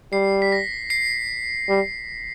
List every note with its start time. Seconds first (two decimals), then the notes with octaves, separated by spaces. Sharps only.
0.13 G3 C7
0.42 B6
0.52 A#6
0.90 C7
1.69 G3